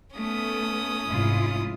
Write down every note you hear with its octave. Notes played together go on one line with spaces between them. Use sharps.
A3 B3 C#4 D#6
F1 G#2 E4 F4